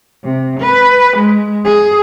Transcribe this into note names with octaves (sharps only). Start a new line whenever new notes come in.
C3
B4
G#3
G#4